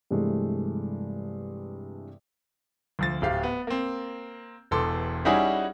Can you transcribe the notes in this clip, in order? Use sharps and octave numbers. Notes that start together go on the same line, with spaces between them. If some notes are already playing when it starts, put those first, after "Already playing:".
G2 C3 E3 G#3 A3
D2 F3 A6
D1 G4 F5
B3
A#3 C4
E1 E2 A4 C6 D6
G3 C#4 D#4 E4 F#4 G#4